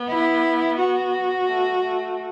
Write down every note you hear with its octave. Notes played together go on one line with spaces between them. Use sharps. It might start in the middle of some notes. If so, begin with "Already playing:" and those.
Already playing: B3
E4
F#4
A3
A3